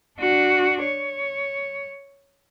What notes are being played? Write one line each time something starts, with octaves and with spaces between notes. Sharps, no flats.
D4 F#4
C#5